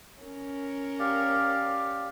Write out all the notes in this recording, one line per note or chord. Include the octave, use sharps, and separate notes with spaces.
C#4 A#4
G4 D5 F5